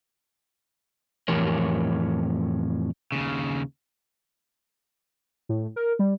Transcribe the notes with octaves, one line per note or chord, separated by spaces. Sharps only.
F2 A2 E3 G4 A#4 C#5
D#2 C#3
A2
A#4
G3